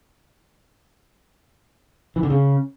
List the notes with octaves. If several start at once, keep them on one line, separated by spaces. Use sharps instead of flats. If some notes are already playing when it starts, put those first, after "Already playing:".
E3
D3
C#3